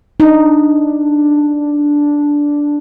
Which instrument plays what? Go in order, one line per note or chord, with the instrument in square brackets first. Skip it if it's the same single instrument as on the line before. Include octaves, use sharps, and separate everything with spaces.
[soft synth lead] D4 [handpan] D#4